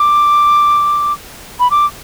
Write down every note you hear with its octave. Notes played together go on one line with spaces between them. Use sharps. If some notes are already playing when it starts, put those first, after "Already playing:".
Already playing: D6
B5
D6